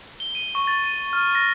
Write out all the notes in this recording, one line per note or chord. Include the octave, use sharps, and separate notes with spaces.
G7
D#7
C#6
A6
D#7
F6
A#6